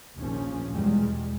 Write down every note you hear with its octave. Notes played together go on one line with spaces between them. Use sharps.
A#1 D#2 F3 C#4
E2 B2 G3 G#3